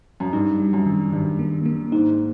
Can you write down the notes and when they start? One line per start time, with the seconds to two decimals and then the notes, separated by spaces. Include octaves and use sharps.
0.20 F#2
0.33 G2 D#4
0.60 G3
0.73 F#2
0.86 D#3
1.12 G2 D#3
1.39 A#3
1.66 A#3
1.92 G#2 D#4